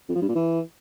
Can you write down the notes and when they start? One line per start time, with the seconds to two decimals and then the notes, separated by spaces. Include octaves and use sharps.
0.09 F2
0.15 F3
0.22 G2
0.29 A#2
0.35 E3